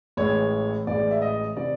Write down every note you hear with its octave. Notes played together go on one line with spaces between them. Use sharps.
A1 A2 E3 G#3 C#5
A1 A2 E3 G#3 D5
E5
D#5
C3 E3 D5